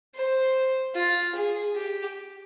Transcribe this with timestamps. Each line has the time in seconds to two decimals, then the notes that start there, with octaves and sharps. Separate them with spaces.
0.15 C5
0.95 F4
1.35 G#4
1.76 G4